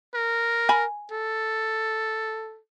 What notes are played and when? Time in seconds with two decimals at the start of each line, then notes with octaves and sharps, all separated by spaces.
0.14 A#4
0.69 G#5 B5
1.12 A4